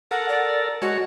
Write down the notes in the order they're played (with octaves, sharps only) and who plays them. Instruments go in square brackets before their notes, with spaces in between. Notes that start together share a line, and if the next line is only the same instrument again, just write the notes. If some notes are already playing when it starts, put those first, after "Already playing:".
[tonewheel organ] A4 A#4 [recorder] F#5
[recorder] D5
[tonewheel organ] G#3 C#5 [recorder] F#4